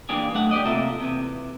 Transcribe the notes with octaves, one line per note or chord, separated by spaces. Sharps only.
E3 A#3 D4 G4 G#4
B1 A3 F#5
G4 B4 D5 D#5
C3 A#3 F4 A4 A#4 E5
C3 E3